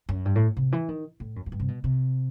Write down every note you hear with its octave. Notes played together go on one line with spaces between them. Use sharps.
F#2
G2
A2
C3
E3
D#3
A2
F#2
F#2
G2
C3
B2
C3